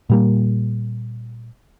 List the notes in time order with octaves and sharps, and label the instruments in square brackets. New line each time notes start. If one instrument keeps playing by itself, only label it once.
[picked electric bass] A#2 G3 A#3